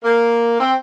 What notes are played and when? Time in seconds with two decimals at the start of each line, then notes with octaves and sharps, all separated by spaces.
0.04 A#3
0.60 C4